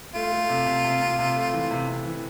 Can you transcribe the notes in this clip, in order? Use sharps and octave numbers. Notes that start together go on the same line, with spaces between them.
A3 F4
A3
C3
C3
C3
C3
C3
A3
E3
C3
C3
E3